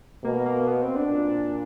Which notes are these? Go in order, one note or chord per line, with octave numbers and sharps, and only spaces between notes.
B2 A#3
A#3
B3
C4
D4
A#2